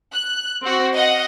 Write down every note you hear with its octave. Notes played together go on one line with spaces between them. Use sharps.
F#6
C4 F#4
D#5 F5 F#5